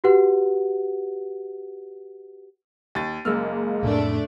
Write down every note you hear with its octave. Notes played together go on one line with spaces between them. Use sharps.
F#4 G4 B4 F#5
D#2 A6
F#1 G#3 A#3 E6 F6
F2 A2 C3 A3 D4